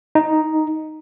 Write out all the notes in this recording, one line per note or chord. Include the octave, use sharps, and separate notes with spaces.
D#4